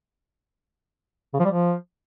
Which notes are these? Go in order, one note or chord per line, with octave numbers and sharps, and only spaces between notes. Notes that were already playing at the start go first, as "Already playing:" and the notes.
C#3
F3
G3
F3